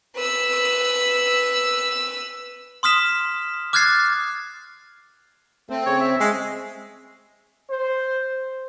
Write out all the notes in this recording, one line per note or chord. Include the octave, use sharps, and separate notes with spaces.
B4 E6
C6 D#6 F6 B6 E7
D6 F6 F#6 G#6 A6 C7
A3 C4
C#3 C#5
E5
G#3
C5